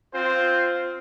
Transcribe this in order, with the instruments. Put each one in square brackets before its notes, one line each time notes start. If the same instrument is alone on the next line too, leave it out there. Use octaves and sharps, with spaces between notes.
[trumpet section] C4 F4 C5